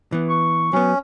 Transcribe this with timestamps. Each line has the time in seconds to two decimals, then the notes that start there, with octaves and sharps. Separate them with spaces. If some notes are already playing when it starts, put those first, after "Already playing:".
0.12 E3 B3
0.29 C#6
0.73 F#3 B3 C#4